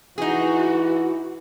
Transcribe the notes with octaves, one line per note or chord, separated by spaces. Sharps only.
E3 D#4 F#4 G#4